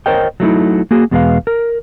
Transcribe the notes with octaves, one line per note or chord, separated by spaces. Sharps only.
A#4 C5 C#5 D#5 G5
F#3 A3 D#4 E4
A#3 F#4 G#4
E2 B2 G#3 E4 B4 F5
A#4